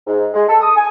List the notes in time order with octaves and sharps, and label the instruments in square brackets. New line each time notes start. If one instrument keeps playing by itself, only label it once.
[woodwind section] G#2
G#3
A4
D#6
G#5